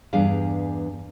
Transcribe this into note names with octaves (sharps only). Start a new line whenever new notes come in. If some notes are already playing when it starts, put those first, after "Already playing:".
E2 G2 D4 G#4 F5